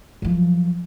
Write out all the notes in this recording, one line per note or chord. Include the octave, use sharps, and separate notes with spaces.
F#2 F3